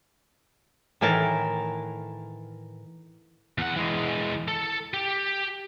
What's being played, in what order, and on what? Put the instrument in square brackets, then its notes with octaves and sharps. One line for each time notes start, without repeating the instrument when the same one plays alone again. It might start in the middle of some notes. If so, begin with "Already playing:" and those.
[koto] A2 D#3 E3 A#4 A5
[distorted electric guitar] E2 F#5
E3 G#3
A4
G4